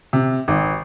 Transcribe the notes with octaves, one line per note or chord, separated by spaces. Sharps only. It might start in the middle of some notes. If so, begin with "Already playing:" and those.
C3
G#1